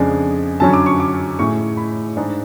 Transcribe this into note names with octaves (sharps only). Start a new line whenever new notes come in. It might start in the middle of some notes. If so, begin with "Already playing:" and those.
Already playing: F2 C#3 G#3 D4 G#5
F#2 D3 F#3 C#4 A5
D6
C#6
D6
A2 G#3 C#4 C#6
B5
G#2 G#3 D4